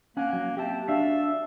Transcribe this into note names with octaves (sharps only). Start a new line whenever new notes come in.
A#3 C#4 F#5 G#5
F#3
C4 G4 E5 A5
D4 F#4 E5 F5